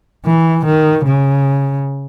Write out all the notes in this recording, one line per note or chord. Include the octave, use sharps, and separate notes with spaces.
E3
D#3
C#3